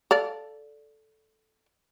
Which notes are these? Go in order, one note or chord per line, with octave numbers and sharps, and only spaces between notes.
A4 D5 F5